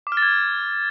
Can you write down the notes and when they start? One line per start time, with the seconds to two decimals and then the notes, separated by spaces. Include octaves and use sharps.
0.07 D6
0.12 F6
0.17 A6
0.22 G#6